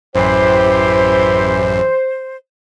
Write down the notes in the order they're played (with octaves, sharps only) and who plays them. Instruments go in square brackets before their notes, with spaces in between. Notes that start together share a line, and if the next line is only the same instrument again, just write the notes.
[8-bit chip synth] A1 F#2 [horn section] E3 G4 [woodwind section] C5